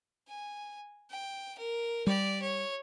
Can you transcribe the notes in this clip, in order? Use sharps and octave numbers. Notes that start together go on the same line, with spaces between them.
G#5
G5
A#4
G3 G4 D5
C#5